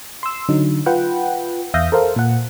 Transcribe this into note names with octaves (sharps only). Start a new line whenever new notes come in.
C6 E6
D3 F#3 D#4
F4 B4 F#5 G5
E2 E5 F5 D#6 G6 A#6
A4 A#4 C5 F5
A#2 F#5